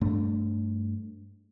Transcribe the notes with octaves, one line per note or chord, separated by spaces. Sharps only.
G2 A3 D4